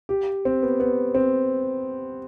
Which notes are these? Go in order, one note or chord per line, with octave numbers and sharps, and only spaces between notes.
G4
C4
B3
B3
C4